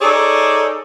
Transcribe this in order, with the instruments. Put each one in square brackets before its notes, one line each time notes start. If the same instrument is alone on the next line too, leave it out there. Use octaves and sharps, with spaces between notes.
[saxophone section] D#4 G#4 A4 C#5 D5